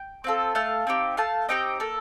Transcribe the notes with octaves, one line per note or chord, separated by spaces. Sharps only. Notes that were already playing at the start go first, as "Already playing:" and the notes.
Already playing: G5
C4 F4 A4
A3 F5 A5
C4 D#4 G4
A3 F5 A5
C4 D#4 G4 D#5 G5
A#3 A4